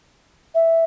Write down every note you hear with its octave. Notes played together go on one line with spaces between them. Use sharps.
E5